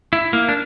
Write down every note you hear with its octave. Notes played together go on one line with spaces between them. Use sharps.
E4
A#3
D4